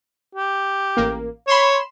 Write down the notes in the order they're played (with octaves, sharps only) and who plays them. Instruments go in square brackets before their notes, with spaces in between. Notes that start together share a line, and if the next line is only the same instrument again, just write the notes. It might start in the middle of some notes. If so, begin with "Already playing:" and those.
[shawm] G4
[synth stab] A1 A#3
[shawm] C#5 [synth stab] B5 C6 E7